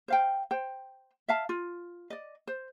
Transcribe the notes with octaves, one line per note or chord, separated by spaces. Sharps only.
C5 F5 G5
C5 G5
E5 F5 A5
F4
D5 D#5
C5